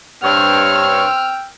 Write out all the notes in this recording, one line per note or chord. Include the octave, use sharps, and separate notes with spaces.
G2 C4 C#5 G5 E6 F6